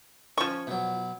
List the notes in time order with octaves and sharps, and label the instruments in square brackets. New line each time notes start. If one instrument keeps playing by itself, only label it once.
[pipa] F3 C#6 [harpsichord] C#4 G#5
[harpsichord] B2 F#3